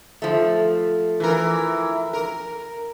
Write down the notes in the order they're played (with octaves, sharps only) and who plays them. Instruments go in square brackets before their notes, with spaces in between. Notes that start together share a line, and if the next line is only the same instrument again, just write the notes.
[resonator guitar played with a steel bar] F3 A3
[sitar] E3 A#4
A#4